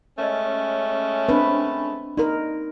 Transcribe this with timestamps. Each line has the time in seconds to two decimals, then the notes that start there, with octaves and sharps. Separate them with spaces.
0.18 G#3 A3 C#4 A#4 D5 D#5
1.29 C4 D4 B4
2.17 D#4 A#4 D5 C6